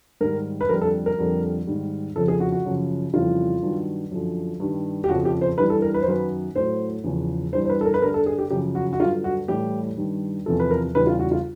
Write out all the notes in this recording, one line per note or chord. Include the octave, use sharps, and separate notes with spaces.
G#2 D#3 G3 A#4
B4
F2 D3 G3 A#4
A4
A#4
F2 D3 G3
G#2 D#3 G3
F2 C#3 F3 A4
G#4
F#4
F#4
F#2 C#3 F3
F2 C#3 E3 G3 F4
G2 D#3 F#3
F#2 D3 F3
G2 D#3 G3
G4
F2 C#3 F3 F#4
G4
C5
G2 E3 G3 B4
A4
A#4
B4
C5
F#2 D#3 F#3 B4
A2 F#3 C5
E2 C#3 F3
G2 E3 G3 C5
C5
B4
A4
A#4
B4
G2 D3 G3 A#4
A4
G#4
G4
F#2 C#3 F3 G4
F#4
F#4
G2 D3 F#3 F4
F#4
A2 E3 G3 G4
G2 D#3 G3
E2 C3 F3 A4
B4
A#4
E2 C#3 E3 G3 B4
F4
F#4
F4